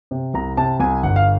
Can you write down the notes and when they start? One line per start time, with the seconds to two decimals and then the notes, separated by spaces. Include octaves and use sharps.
0.11 C3
0.34 C2 A#5
0.57 C3 A5
0.80 C2 G#5
1.03 G1 F#5
1.16 F5